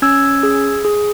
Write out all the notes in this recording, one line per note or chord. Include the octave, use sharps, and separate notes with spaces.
C#4 E6 G#6
G#4
G#4